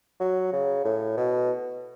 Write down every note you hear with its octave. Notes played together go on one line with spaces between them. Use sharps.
F#3
C#3
A2
B2